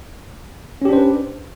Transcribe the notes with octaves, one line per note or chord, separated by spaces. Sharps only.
C#4 D4 G4 B4 C5